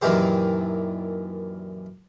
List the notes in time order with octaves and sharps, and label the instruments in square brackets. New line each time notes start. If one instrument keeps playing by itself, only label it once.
[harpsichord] F#2 A#2 D#3 E3 G4 C5